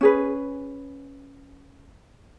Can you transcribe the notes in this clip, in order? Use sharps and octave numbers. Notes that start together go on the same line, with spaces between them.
C#4 G#4 B4